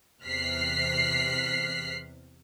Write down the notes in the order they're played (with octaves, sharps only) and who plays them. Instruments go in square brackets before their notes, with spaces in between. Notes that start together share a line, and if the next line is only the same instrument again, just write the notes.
[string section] E2 C3 F6 F#6 B6 C7